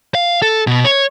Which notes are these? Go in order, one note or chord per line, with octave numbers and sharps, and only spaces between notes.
F5
A4
B2
C#5